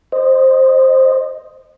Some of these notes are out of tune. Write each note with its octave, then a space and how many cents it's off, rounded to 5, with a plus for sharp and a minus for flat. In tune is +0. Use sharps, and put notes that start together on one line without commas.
C5 +10 D#5 -20